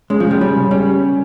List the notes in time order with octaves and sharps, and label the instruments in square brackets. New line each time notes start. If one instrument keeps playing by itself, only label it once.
[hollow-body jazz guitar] G#3 [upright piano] C#4
[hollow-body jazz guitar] F3
[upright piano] C#3
[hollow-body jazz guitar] G3
[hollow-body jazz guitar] G3 [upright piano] C#4
[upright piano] C#3
[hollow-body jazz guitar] G3 [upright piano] C#4